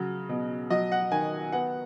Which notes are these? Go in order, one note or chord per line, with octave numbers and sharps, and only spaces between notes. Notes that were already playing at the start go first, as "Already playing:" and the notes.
Already playing: C#3 F#3
B2
F#3 D#5
F#5
D#3 G#5
B3 F#5